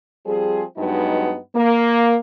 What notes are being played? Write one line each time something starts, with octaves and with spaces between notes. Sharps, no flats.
F3 G3 C4 G#4
G2 F#3 G#3 B3 D#4
A#3